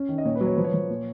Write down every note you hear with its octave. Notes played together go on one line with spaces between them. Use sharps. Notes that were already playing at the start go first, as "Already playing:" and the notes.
Already playing: C#4
D#3
D#5
A#2 C#5
B4
F#3
C#5
F3 B4
C#5
F3
A#2